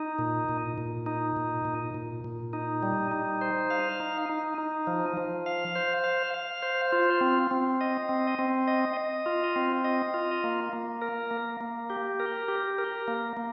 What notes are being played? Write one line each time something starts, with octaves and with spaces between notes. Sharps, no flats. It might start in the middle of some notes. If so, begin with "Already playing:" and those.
Already playing: D#4
A#2
A#2
A#2
D#4
A#2
A#2
A#2
A#2
D#4
G3
D#4
C5
F5
D#4
D#4
D#4
F3
F3
F5
C5
F5
F5
C5
F4
C4
C4
D#5
C4
C4
D#5
D#5
F4
C4
D#5
F4
A#3
A#3
A#4
A#3
A#3
G4
A#4
G4
A#4
A#3
A#3